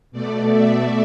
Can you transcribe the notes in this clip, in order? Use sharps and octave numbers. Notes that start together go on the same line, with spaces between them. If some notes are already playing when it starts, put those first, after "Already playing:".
B2 A3 D5
E5